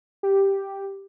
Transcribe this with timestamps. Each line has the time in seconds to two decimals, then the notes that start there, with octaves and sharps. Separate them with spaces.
0.23 G4